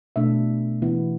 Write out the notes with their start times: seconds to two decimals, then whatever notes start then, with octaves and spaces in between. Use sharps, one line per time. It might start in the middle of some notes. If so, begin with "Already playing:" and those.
0.16 B2 A3 D4 E5
0.82 E3 B3 E4